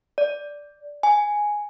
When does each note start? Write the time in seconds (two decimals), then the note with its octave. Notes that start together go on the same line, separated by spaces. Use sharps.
0.18 D5
1.03 G#5